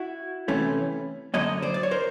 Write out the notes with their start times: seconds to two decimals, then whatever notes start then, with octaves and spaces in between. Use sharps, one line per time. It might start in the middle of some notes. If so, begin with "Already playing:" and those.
Already playing: E4 F#4
0.48 C3 E3 A3 C#4
1.34 F#2 D3 F#3 A#3 C#5 D#5
1.62 C5 D5
1.74 D5
1.83 C#5
1.91 A#4 C5